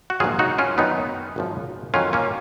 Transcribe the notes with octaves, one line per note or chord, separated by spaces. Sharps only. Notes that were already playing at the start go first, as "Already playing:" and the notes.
F#4
A#1 G#2 D#3 F#3 F4 G#4
D#4 F#4
C#4 F4
F#2 D#3 F#3 B3 D#4
G#1 F#2 F3
F2 D#3 F#3 C#4 F4
A#3 C#4